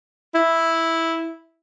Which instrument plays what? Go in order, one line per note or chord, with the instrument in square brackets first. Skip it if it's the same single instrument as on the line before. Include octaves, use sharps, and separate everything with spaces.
[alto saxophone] E4